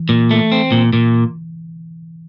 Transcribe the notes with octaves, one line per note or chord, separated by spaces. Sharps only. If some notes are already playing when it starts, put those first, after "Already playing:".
Already playing: E3
A#2
A3
C4
A#2
A#2